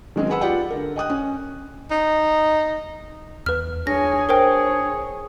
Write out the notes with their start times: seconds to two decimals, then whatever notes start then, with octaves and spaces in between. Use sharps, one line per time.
0.16 D#3 F#3 G#3 C4 C#4
0.30 G#4 B4 F#5 B5 E6
0.41 F4 G4 D5 F#5 G5
0.70 D3 A#4
0.96 D#5 G5 D#6 F#6
1.10 C#4
1.91 D#4
3.46 E2 B4 F6
3.87 D4 G#4 C#5 G#5 A#6
4.29 A#4 C5 C#5 G5